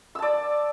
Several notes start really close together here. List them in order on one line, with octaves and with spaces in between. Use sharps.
E6 A5 D5